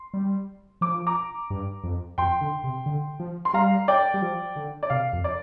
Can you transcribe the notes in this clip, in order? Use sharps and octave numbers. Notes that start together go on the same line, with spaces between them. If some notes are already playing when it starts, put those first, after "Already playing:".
Already playing: C6
G3
F3 D6
A#5 D6
G2
F2
F2 G5 C6
D3
C3
D3
F3
C6
G3 F5 A#5
D5 G5
G3
F3
D3
D5
C3 F5
F2
D5